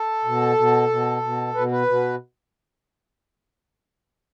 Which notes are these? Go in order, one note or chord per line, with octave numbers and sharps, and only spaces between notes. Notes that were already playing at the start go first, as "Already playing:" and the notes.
Already playing: A4
B2
B2
B2
B2
B2 B4
B4
B2